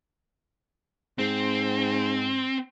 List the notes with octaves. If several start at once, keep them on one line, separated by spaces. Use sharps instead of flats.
G#2 C4